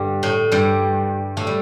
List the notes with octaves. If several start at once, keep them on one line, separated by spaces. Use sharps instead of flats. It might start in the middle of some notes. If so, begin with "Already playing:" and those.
Already playing: G2 D3 G3
A2 A3
G2 G3
A2 A3
G3